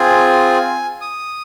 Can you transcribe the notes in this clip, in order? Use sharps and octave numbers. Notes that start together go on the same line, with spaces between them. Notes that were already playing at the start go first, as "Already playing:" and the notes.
Already playing: C4 F4 G#4 G#5
D#6